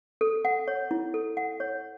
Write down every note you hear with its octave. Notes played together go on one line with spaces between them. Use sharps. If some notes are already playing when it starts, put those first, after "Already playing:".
A4
F#5
C#5
E4
A4
F#5
C#5